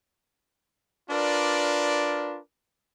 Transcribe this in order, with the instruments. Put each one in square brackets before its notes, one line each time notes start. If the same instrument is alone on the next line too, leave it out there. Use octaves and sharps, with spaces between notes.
[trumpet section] D4 F4 A#4 B4 D5